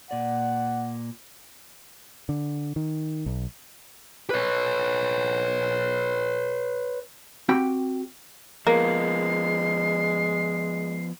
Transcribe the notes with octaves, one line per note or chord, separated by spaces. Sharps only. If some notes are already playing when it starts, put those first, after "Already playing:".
A#2 D5 F#5
D3
D#3
B1
B4 C#5
C4 F#4 G4 G5 B5
F3 G#3 A#3 B3 C7